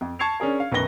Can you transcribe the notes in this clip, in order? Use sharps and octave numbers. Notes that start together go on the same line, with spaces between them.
F2
A5 C#6 G#6 C7 C#7 F7
C#4 D4 G#4 A#4
F5
B1 F#2 D#3 B4 A#6 G7